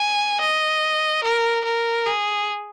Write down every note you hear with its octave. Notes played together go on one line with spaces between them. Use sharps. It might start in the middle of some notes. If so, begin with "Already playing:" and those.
Already playing: G#5
D#5
A#4
A#4
G#4